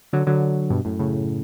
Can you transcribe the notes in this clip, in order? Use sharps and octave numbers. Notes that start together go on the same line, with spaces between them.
D3 F#3
D3 F#3
G2 B2
F#2 A2
A2 C#3